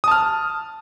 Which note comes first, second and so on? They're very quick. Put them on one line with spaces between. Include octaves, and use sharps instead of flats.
D#6 A5 F6